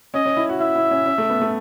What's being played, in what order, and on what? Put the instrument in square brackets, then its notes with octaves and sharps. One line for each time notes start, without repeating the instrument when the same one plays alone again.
[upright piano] C#4 [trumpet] D#5
[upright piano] C#4
E4
F#4
[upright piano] E4 [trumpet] E5
[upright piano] E4
C#4
C#4
A3
B3
A3